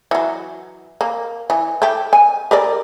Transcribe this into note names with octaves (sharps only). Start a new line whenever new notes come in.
E3 F#3
A#3
E3
A3 G4
G#5
G4 A#4 D5